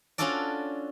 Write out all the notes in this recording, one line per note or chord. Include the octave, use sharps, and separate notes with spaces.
C#4 D4 F4 F#4 A4 D5